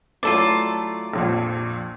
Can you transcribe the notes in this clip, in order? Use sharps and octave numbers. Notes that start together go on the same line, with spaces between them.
F#3 A3 E4 F4 A4 D5
A#1 F2 A#2